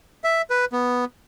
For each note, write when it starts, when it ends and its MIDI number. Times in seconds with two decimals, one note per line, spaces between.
0.24 0.42 76
0.50 0.65 71
0.73 1.05 59